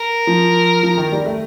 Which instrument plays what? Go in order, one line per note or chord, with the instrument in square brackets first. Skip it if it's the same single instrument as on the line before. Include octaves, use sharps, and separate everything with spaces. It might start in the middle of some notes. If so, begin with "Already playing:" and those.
Already playing: [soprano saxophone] A#4
[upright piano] F3
F3
D#3
G3
A3